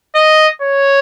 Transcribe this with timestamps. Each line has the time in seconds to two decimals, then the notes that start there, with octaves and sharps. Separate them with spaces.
0.15 D#5
0.62 C#5